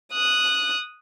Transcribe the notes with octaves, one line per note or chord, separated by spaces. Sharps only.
D#6 F#6